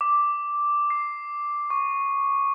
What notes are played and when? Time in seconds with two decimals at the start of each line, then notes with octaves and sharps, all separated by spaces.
0.01 D6
0.90 C7
1.70 C#6